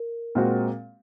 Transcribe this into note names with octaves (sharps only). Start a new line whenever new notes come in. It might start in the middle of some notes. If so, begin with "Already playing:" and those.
Already playing: A#4
A#2 G#3 C4 F#4